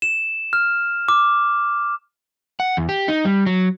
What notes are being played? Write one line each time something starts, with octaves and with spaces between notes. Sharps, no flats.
E7
F6
D6
F#5
E2
G4
D#4
G3
F#3